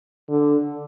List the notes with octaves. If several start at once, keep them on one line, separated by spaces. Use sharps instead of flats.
D3